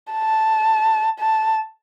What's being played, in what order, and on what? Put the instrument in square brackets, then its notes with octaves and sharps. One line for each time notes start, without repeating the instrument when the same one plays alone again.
[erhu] A5
A5